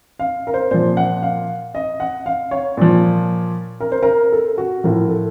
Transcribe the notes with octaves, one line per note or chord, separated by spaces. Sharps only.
F5
A#4
C5
A#2 F3 C5
F#5
F5
D#5
F#5
F5
C#5
A#2 F3
A#4
C5
A#4
A4
F#4
A2 F3 A#4
A4